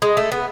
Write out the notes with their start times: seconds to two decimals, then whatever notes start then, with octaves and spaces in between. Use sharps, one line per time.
0.02 G#3
0.17 A3
0.32 B3